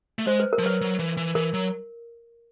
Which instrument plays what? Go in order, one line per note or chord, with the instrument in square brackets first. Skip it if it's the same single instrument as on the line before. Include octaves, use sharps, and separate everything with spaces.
[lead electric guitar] A3
[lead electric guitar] G#3 [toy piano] C5
[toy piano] B4
A#4
[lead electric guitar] F3
[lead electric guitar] F#3 [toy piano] B4
[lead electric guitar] F#3
E3
E3
[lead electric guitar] E3 [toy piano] A#4
[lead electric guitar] F#3